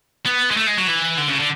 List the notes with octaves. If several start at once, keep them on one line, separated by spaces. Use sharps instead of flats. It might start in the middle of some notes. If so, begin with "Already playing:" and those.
B3
G#3
A3
G#3
F#3
E3
D3
C#3
D3